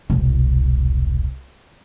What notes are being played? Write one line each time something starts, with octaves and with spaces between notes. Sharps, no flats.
E1 C2